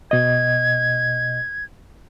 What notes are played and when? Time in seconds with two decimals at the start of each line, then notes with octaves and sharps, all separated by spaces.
0.11 B2 D#5 G#6